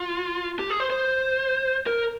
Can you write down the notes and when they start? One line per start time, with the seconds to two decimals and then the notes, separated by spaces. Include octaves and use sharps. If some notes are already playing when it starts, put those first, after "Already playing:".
Already playing: F4
0.59 G4
0.70 G#4
0.80 C5
0.90 C5
1.87 A#4